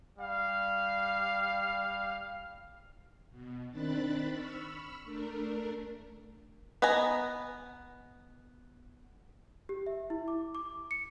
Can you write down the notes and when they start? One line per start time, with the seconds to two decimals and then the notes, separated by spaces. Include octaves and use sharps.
0.18 G3 F5
3.30 B2
3.71 D#3 C4 D4 B5 F#6 A6
4.28 B5 C#6 E6 F6
5.04 A3 D4 A#4
6.82 B3 B4 D#5 G#5 A#5
9.69 G4
9.86 E5
10.10 E4
10.28 D6
10.55 D6
10.91 C#7